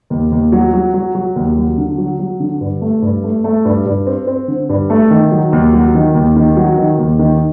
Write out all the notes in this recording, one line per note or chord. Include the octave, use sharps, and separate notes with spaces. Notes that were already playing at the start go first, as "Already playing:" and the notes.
D#2
D#2
F#3
F#3
F#3
F#3
D#2
F#3
D3
F#3
F#3
D3
G2
A3
G2
A3
A3
G2
G2
C4
C4
D3
G2
A3
D#3
F#3
D#2
F#3
D#3
D#2
D#3
F#3
D#3
D#2
D#3